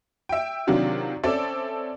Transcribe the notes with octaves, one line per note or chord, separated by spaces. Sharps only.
E5 G5
C3 D#3 F#3 D4 F4 G4
C4 C#4 A4 D5 E5 A5